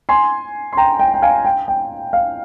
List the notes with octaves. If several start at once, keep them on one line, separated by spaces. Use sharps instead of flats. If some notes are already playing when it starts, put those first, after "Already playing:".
G#5 C6
C6
G5 A#5
G5
G5
F5 G#5
G5
G5
F5